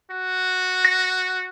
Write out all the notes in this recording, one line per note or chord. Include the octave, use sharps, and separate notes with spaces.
F#4
A#6